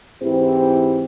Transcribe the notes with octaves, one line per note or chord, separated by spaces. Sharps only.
G#2 E3 C4 E4 G4 C5